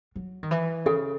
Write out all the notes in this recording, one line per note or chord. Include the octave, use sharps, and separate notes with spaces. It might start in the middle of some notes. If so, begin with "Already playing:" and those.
F#3
D#3
E3
C#3 A4